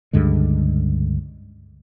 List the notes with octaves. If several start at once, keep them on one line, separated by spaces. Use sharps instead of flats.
C#2 G2 D3 G#3